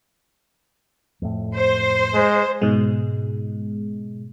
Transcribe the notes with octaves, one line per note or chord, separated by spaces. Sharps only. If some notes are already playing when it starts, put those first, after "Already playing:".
F2 A2
C5
G#3
G#2 B2 G#3